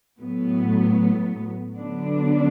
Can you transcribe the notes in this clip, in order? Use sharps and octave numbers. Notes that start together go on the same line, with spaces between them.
A2 F#3 B3
D3 F#3 B3 D4